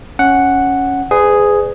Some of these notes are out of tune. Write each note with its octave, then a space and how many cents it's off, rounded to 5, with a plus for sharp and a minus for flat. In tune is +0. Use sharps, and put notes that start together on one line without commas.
C#4 +0 F#5 +0
G#4 +0 B4 +35 D5 +0